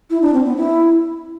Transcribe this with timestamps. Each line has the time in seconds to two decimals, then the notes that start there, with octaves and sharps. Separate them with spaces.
0.10 E4
0.22 D4
0.33 C4
0.45 B3
0.56 E4